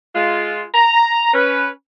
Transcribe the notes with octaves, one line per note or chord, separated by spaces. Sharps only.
G#3 F4
A#5
C#4 B4